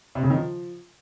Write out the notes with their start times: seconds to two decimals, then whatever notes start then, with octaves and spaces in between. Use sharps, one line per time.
0.15 C3
0.23 C#3
0.30 D#3
0.38 F3